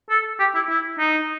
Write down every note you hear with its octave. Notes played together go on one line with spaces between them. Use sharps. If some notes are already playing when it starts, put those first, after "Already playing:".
A4
G4
E4
E4
D#4